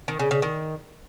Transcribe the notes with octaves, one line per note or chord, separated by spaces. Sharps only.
D#3
C#3
C#3
D#3